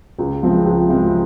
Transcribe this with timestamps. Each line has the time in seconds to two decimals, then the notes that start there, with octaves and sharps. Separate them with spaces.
0.18 C#2
0.42 C3 F3 G#3 C4
0.65 C#2
0.88 C3 F3 G#3 C4